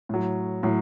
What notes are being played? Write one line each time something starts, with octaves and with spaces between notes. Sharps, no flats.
A2 F#3
A2 F#3